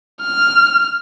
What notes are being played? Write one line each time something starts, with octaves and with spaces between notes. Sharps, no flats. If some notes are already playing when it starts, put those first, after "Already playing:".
F6